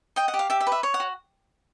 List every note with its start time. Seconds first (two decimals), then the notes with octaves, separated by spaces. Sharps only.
0.16 D#5 G5
0.28 F#5
0.34 G4
0.39 F5
0.50 G4 E5
0.61 E5
0.67 B4
0.72 E5
0.83 C#5
0.94 F#5
1.00 F#4